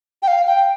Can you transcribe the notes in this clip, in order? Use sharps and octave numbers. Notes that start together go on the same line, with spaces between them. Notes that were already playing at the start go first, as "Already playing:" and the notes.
G5
F5
G5